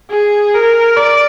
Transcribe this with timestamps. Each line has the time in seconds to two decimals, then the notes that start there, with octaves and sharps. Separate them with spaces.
0.10 G#4
0.54 A#4
0.97 D5